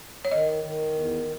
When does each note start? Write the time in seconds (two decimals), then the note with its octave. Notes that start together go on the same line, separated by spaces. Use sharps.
0.25 C#5
0.32 D#3 D#5
0.63 D#3
0.93 E2